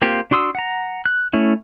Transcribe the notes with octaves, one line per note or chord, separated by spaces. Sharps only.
A#3 C4 F4 G4
D4 F#4 C6 D#6 E6
F#5 A#5
F#6
A3 C#4 E4